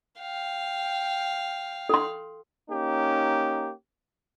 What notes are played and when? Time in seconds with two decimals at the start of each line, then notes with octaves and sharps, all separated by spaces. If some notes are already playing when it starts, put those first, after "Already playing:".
0.22 F5 G5
1.89 A4 C6
2.70 A#3 C#4 D#4 G4